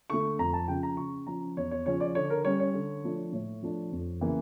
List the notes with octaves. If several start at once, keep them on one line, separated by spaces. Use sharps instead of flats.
D3 A3 C#6
F2 A#5
A5
C#3 F3 G5
A#5
C#3 C#6
F3 C#4 A#5
E2 C#5
C#5
C#3 F3 C#4 C#5
D5
D3 C#5
A#4
G3 C#4 C#5
C#5
D3
F3 A3 D4
A2 C#5
F3 A3 D4
F2
C#3 E3 A#3